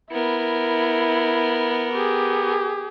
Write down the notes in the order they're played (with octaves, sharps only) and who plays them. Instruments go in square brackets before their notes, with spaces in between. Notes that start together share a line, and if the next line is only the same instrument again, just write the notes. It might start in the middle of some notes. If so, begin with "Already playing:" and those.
[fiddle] B3 A#4 [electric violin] E4
[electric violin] G4 G#4